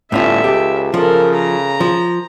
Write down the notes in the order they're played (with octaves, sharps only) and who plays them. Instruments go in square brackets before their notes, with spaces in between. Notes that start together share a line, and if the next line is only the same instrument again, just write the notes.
[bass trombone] G1 [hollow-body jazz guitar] A2 C#4 F4 [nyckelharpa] A4 E5
[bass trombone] C#2 [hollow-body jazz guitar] G4
[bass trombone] C#3 [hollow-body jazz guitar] F3 [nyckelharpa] A4 A#4
[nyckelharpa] A#5
[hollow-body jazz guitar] F3